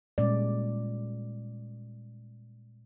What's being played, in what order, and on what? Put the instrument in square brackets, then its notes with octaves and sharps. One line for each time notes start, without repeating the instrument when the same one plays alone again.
[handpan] A#2 G3 G#3 C#4 D5